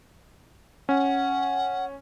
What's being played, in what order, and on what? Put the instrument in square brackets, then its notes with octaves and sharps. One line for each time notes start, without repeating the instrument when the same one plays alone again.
[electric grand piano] C#4 [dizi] F#5